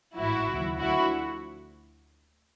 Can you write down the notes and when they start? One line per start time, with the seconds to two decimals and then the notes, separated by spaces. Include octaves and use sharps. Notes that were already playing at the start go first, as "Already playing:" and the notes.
0.16 A1 G#2 F3 E4 F#4
0.49 D#2 C#3 F#3
0.80 D2 D3 F3 E4 F#4